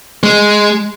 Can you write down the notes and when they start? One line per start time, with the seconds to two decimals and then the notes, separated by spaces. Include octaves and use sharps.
0.23 G#3